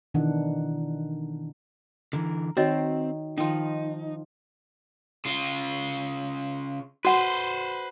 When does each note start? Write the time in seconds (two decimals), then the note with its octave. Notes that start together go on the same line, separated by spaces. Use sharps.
0.14 B2 D#3 E3 D4 D#4 F#5
2.13 D3 E3 A#4
2.57 D#3 C4 F#4 C#5 D#5
3.38 D#3 F3 D#4
5.25 C#3 F4
7.05 F#4 B4 C5 F#5